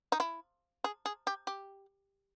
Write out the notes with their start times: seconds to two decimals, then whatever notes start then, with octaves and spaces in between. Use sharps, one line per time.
0.12 D#4
0.20 E4
0.84 G#4
1.06 G#4
1.27 G4
1.47 G4